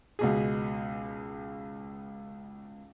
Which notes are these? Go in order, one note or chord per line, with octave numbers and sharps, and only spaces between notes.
C#2 B2 G#4